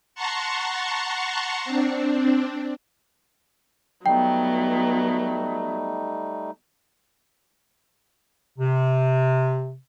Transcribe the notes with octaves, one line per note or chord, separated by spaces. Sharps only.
F#5 A5 A#5 C6 C#6
C4 D4
F#3 G3 A3 B3 D#4 G5
C3